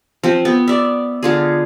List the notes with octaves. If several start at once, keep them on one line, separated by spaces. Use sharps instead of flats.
F3 C4
B3
D5 E5
D3 F4 G#4